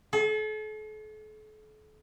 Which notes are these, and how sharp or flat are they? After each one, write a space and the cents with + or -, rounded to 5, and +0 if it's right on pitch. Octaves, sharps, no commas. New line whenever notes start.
A4 -40